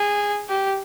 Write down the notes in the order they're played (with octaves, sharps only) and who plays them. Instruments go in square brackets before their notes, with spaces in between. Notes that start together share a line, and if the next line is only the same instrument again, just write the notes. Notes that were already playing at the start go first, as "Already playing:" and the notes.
Already playing: [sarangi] G#4
G4